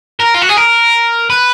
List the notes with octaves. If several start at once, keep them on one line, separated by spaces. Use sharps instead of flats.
A#4
F4
F#4
G#4
A#4
B4